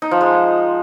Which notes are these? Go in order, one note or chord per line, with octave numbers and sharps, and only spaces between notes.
D#4
F3
G#3